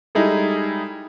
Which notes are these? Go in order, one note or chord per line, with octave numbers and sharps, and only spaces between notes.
G3 G#3 D#4 E4 G#4 A4